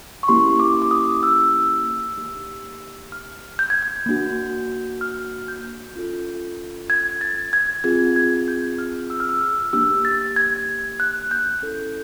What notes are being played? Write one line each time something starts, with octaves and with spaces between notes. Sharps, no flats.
C#6
A#3 C#4 E4 G4 C6
D6
D6
D#6
E6
A#3 D#4 G4
F6
G6
G#6
G6
A#3 D4 F#4
F6
G6
C#4 F4 A4
G#6
A6
G#6
C4 F4 G#4 G#6
G#6
G6
F6
E6
F6
E6
F6
A#3 D4 G4 E6
A6
G#6
F#6
G6
C#4 E4 A4 G6